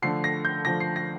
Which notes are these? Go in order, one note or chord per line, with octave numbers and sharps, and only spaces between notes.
D3 F3 A3 C7
A#6
G6
D3 F3 A3 A#6
C7
A#6